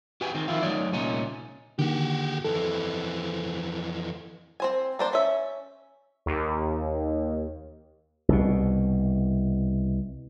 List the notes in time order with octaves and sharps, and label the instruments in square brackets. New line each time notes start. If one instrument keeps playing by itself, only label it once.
[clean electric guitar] F#4 G4 B4 G5 G#5
D#3 C4
D#3 F3 E4 F4
F#3 A3 D#4 C#5 D5
C2 A#2 C#4 D#4
[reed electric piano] D3 D#3 A#3 [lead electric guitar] F#4 G4
[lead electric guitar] F2 E3 [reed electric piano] A4
[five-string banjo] C4 C5 G#5
A#3 D4 C5
C#4 E5
[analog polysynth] D#2
[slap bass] C2 B2